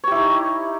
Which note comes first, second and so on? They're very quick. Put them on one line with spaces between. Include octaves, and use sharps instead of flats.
C#5 G4 E4 D#4